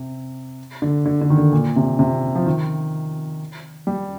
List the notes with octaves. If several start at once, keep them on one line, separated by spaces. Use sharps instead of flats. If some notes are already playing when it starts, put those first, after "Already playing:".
Already playing: C3
D3
D3
D3
D#3
D3
A#2
C3
C3
F3
D#3
G3